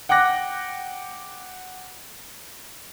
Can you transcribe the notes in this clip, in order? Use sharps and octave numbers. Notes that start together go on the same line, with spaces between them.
F#5 G5 D6 F#6 A#6